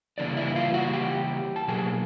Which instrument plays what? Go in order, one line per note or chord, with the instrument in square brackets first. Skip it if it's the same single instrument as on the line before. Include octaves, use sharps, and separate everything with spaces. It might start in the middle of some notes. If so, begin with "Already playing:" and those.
[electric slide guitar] C#3 E3 G3 A#3 D4 D5
E4 E5
F4 F5
F#4 F#5
G4 G5
A5
B2 F#3 A#3 G#4 G#5